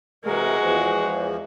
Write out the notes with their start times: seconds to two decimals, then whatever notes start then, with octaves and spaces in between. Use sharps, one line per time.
0.25 C3 E3 G#3 F#4 A#4
0.61 E2 E3 F3